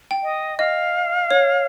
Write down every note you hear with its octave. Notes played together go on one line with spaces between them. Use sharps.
G5
D#5
D#5 F5
C#5